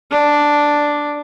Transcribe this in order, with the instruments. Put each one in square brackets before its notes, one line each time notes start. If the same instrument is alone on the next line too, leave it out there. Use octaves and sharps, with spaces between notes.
[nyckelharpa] D4